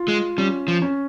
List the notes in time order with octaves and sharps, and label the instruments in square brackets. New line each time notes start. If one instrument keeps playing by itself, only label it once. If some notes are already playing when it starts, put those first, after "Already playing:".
Already playing: [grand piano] F4
[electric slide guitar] G#3
[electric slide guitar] G3 [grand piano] C#4
[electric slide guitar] F3
[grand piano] C#4